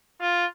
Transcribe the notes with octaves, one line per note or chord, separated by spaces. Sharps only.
F4